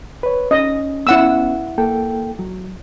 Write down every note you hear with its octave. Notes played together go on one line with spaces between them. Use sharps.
B4 C#5
C#4 D#5
B3 C#4 E4 F#5 E6
A#3 A4 G5
F#3